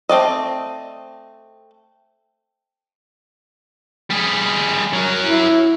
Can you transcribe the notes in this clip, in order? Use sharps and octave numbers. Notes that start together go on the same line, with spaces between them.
A3 C4 D5 D#5
G3 G#4
F#3 A#4
E4